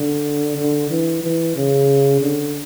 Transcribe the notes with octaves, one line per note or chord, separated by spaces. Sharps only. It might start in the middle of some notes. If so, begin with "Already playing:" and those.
Already playing: D3
D3
E3
E3
C#3
D3